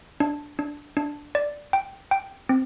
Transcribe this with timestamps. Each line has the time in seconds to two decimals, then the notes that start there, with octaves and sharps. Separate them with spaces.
0.20 D4
0.59 D4
0.97 D4
1.35 D5
1.73 G5
2.11 G5
2.49 C4